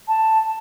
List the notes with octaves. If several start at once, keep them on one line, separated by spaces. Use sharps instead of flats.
A5